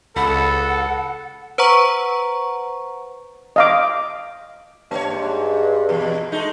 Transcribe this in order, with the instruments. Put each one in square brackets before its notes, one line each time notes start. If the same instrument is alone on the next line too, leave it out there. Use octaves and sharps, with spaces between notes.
[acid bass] C#2 [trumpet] A4 [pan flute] F#5 [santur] B5
[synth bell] B4 C5 F#5 A#5 C#6
[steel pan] D#5 F5 D6
[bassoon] G2 [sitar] A#3 C#5
[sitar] G#2
E2 B2
G#3 A3 D#4